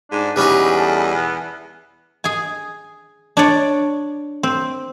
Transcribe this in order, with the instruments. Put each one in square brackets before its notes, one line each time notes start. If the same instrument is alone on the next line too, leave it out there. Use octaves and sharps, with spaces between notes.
[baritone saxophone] G#2 [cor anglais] D4
[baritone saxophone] E2 [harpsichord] G3 C#4 D#4 [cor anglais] B4
[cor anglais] A4
B3
[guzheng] G#4 G#5
D4 C#5 D5
C4